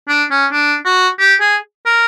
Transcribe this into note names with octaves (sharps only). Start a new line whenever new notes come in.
D4
C#4
D4
F#4
G4
G#4
A#4